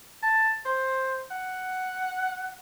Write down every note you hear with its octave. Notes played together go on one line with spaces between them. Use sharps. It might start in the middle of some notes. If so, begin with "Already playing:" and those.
A5
C5
F#5